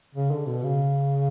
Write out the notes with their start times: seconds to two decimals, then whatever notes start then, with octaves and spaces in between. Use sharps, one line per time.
0.15 C#3
0.31 D3
0.47 B2
0.63 C#3